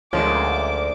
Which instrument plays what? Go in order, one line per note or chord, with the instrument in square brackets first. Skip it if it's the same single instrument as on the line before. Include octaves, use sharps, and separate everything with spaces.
[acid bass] D2 [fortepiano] F3 G#3 A#3 [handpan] C#5 [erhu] D6